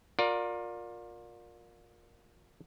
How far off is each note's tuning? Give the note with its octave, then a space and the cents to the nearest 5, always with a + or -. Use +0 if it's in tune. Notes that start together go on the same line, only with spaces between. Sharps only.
F4 +30 A#4 +5 D5 +0